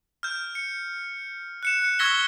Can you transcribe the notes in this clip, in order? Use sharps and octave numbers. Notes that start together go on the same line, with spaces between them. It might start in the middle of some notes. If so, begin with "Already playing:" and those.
F6 G6
C#7
F#6 C#7 E7
F#6 C#7
C#6 E6 G#6 A#6 B6 G7